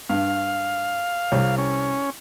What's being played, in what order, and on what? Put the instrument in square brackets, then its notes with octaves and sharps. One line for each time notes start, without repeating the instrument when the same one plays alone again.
[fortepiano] G2 [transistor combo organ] F5
[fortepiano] C2 G3 C#5
[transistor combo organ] C#4